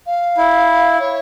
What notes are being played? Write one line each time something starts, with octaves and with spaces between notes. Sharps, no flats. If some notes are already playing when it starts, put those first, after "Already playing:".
F5
E4
C#5